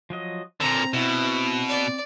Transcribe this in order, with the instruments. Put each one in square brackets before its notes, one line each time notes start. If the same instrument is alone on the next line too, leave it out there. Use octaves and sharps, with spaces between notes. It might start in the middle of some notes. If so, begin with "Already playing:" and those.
[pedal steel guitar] F3 F#3 D#5
[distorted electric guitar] A#2 D3 [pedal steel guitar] C4 [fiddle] A#5
[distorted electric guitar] B2 [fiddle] E4
[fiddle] D5